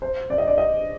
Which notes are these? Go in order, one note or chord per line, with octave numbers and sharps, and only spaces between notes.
C5
D5
D#5
D5
D#5